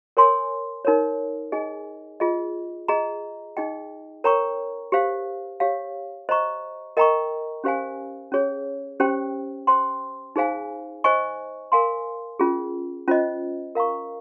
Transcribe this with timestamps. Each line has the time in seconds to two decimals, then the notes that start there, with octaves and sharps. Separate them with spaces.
0.17 A#4 C#5 G#5 C6
0.85 D#4 A#4 C#5
1.52 D#4 G#4 D#5 G#5
2.20 F4 G#4 D#5
2.88 G#4 D#5 A#5
3.57 D#4 G#4 D#5 G5
4.24 A#4 C#5 G5 A#5 C#6
4.92 G4 C5 F5
5.60 G4 C#5 F5
6.29 C5 D#5 A#5 C#6
6.97 A#4 D#5 G5 A#5 C#6
7.64 C#4 G4 C5 F5 G#5
8.32 C#4 G#4 C#5
9.00 C#4 G4 C5 G5
9.67 C5 G5 C6
10.36 D#4 G#4 C5 F5 G#5
11.04 C5 D#5 G#5 C#6
11.72 A#4 F5 G#5 C6
12.40 C#4 F4 G#4
13.08 C#4 F4 C5 D#5
13.75 A#4 F5 A#5 C#6